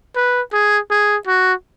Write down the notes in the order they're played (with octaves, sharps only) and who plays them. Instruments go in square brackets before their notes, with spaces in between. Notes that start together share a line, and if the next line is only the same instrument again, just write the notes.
[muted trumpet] B4
G#4
G#4
F#4